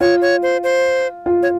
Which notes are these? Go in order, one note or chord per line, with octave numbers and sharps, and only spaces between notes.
F4 C#5
C#5
C5
C5
F4
C#5